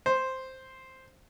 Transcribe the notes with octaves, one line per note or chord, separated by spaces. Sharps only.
C5